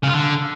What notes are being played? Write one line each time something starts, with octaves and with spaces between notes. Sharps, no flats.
C#3
F4
D3